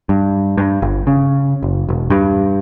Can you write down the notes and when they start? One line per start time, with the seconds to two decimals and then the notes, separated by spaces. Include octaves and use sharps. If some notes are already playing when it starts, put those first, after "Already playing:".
0.09 G2
0.58 G2
0.82 G1
1.07 C#3
1.63 F#1
1.89 E1
2.10 G2